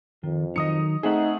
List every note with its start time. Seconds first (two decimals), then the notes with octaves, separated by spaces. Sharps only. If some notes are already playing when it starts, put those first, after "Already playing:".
0.23 F2 D#3
0.56 D#3 F#3 D#4 D#5 D#6 C#7
1.03 A3 C4 D#4 G#4 D#5 E5 F#5